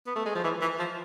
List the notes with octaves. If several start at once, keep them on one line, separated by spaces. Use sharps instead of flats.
B3
A3
G#3
F3
E3
E3
F3